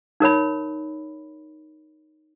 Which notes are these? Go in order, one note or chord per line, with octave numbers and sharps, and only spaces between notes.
D#4 A#4 C#5 B5